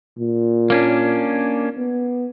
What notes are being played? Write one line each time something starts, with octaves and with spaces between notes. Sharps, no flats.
A#2
A#3 C#4 D4
B3